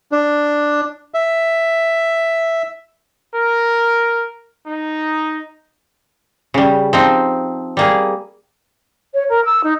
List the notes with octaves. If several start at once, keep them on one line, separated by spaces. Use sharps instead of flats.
D4
E5
A#4
D#4
C#3 G3
F3 C4 D#4
G3 A#3 G#4
C#5
A#4
E6
D#4